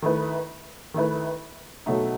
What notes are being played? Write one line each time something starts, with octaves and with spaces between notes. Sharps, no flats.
D#3 A3 E4 B4
D#3 A3 E4 B4
B2 F#3 A3 D#4 A4